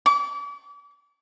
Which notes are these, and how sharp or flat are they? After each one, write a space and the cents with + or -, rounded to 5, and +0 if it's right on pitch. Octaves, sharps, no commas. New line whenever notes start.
D6 -40